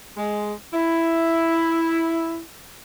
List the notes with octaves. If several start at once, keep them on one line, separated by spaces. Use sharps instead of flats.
G#3
E4